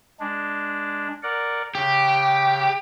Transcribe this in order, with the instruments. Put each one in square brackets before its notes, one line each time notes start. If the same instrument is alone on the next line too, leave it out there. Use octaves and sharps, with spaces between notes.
[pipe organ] G#3 D4
A#4 D5 F#5
[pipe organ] C#3 [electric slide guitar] G4